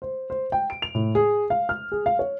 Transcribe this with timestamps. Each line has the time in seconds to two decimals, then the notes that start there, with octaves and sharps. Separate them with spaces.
0.02 C5
0.30 C5
0.52 G5
0.70 D7
0.82 F7
0.95 A2
1.15 G#4
1.50 F5
1.69 F6
1.92 G#4
2.06 F5
2.19 C#5